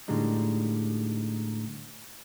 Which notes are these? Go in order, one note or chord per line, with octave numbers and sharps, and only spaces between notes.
A2 D3 G3 G#3 D#4